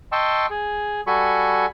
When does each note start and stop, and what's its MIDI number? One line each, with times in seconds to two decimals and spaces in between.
0.12 0.46 75
0.12 0.46 79
0.12 0.46 81
0.12 0.46 84
0.12 0.46 85
0.12 0.46 88
0.50 1.01 68
1.07 1.66 55
1.07 1.66 66
1.07 1.66 69
1.07 1.66 80
1.07 1.66 83
1.07 1.66 85